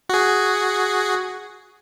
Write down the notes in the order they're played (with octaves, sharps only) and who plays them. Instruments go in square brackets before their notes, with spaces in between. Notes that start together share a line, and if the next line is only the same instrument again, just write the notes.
[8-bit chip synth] F#4 G#4